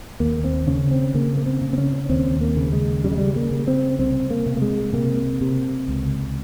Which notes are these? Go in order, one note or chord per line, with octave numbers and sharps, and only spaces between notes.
D#2 A#3
C4
C#3 C#4
C4
C#3 A#3
A#3
C4
C#3
C4
C#4
D#2 C4
A#3
C#3
G#3
C#3 G3
G#3
G3
A#3
C#3
C4
C2 C4
A#3
C3
A#3
G#3
C3 A#3
C3
C#2